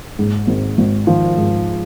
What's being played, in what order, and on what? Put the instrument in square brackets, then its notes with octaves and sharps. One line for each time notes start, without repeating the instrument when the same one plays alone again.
[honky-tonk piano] G#2
G#1
G#1
[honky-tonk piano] D#3 [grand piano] F3
[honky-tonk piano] G#2